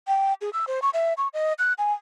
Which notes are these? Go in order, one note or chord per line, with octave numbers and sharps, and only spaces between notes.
G5
G#4
E6
C5
C#6
E5
C#6
D#5
F#6
G#5